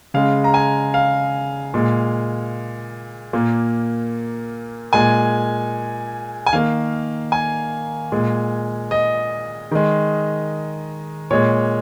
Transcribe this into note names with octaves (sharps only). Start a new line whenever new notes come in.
C#3 G#3 F5
A#5
G#5
F5
A#2 G#3
A#2 A#3
A#2 G#3 G#5
G#5
D#3 A#3 F5
G#5
A#2 G#3
D#5
D#3 G#3
A#2 G#3 C#5